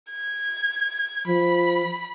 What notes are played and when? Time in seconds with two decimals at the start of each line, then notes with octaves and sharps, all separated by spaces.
0.11 G#6
1.27 F3 B5